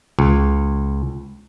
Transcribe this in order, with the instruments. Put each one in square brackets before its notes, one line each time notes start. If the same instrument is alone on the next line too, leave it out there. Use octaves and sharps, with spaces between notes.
[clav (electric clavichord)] C#2